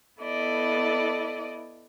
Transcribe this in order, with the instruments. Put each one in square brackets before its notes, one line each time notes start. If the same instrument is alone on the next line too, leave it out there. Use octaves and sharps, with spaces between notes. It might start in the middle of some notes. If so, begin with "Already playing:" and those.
[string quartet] B3 E4 A4 D5 D#5